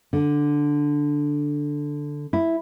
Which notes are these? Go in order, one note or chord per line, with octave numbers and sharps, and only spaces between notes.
D3
E4